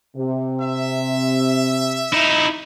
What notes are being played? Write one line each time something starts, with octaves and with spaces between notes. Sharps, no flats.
C3
E5
D#4 E4